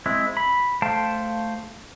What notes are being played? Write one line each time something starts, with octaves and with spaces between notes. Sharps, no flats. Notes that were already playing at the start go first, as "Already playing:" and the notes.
G#3 C4 E4
B5
A3 C5 F5 G5 A5